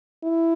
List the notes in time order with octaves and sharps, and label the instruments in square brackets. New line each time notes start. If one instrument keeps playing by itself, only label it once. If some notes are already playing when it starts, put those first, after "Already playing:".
[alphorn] E4